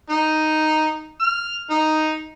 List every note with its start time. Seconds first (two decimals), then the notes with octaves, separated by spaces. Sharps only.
0.10 D#4
1.20 F6
1.70 D#4